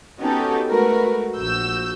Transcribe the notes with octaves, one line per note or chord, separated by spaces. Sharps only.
B3 C#4 D#4 F#4 G4 A4
G#3 A3 F#4 A#4 B4
A#1 F#4 E6 G6